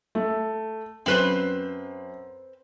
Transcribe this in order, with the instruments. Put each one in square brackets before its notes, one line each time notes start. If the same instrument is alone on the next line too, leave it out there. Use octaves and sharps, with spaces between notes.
[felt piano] A3
[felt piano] F#2 [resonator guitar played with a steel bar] C4 B4 C5